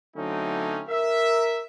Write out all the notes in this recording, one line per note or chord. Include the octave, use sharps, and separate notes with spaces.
D3 F#3 A3 C4 C#4 D#4
A#4 E5